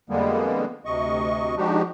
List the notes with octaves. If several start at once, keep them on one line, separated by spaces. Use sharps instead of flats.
F2 D3 G3 G#3 A#3 B3
D2 C3 D#5 C#6
F3 G#3 D4 D#4 F#4 G4